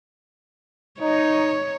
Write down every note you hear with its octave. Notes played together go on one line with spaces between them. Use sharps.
D#4 C#5